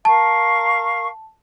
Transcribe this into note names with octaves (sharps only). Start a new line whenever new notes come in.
A#4 F5 A5 C#6